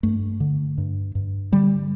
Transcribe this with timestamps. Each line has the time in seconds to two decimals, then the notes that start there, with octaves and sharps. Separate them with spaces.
0.03 G2 A3
0.40 D3
0.78 G2
1.15 G2
1.52 D3 G3